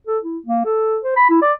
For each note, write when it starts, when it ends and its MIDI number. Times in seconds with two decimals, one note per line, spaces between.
0.07 0.18 69
0.24 0.38 64
0.46 0.62 58
0.65 0.98 69
1.04 1.15 72
1.16 1.27 83
1.29 1.41 64
1.42 1.52 74